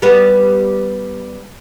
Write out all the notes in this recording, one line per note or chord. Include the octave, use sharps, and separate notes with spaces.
G3 B3